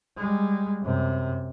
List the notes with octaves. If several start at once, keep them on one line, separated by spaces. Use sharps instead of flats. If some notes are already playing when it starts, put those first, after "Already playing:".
G3 G#3
F#2 C3